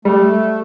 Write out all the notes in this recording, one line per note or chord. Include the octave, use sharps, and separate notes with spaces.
G3 A3